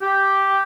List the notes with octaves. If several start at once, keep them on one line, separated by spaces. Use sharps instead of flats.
G4